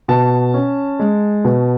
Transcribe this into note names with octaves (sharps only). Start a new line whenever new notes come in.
B2 A5
C#4
G#3
B2